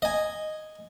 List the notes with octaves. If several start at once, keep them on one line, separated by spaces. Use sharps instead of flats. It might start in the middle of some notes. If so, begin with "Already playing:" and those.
D#5 G#5